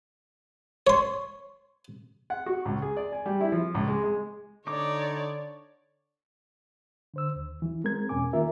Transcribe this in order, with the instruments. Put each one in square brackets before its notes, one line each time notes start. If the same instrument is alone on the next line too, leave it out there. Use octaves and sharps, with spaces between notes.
[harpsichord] C#5 C6
[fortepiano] F#5
F#4
C#2
G#4
D5
G#5
G3
E4
F3
C#2
G#3
G#3
[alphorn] D3 [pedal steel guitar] D#4 D6 [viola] C#5 D5
[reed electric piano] D3 C5 E6
D#2
E3 E4
G#3 C4 A#4 G#6
E2 B2 C#4 G#5 D6
D#3 A#3 F4 A#4 E5